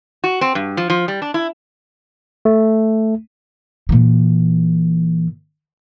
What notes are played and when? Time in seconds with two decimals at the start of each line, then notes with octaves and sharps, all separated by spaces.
0.24 F#4
0.41 C4
0.55 G2
0.77 F3
0.90 F3
1.08 G3
1.22 D4
1.34 E4
2.45 A3
3.89 A#2 E3